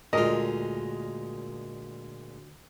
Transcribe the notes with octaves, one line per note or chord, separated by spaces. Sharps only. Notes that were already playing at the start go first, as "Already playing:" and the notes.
D2 A#2 G#3 F4 A#4 D#5